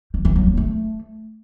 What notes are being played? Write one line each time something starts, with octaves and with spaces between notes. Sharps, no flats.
D#3
E3
F#3
A#3
A3